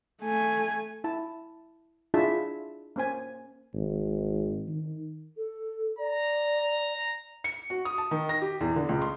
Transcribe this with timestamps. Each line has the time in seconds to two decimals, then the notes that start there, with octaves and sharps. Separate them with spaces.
0.22 A3 G#5
1.04 E4 A5
2.14 D4 E4 F4 G#4 E5 A5
2.96 A#3 C#4 C5 G#5
3.74 G#1
4.67 D#3
5.37 A4
5.99 D5 A#5
7.44 C#7
7.70 F#4
7.85 D#6
7.98 A5
8.11 D#3
8.29 A#6
8.42 G4
8.61 E2
8.76 D3
8.89 C#2
9.02 C6